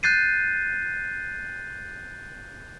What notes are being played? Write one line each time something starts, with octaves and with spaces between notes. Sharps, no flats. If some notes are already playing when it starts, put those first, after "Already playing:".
F#6 G6 A6 C7 D#7